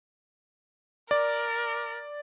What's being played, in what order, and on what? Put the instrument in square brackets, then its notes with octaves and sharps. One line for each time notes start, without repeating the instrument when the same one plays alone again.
[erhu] A#4 [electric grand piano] D5